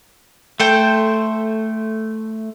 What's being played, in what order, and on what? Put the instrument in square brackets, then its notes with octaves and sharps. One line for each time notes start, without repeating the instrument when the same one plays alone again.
[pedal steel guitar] A3 [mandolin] A4 C5 G5